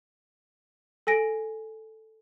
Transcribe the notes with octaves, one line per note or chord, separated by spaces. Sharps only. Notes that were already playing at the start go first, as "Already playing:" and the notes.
A4 G#5 A#6 D7